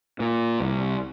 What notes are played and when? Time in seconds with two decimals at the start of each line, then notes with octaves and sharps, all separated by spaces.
0.20 A#2
0.60 C2